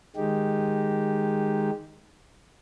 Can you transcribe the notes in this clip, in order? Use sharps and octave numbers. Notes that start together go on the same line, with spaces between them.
D#3 G#3 D#4 G4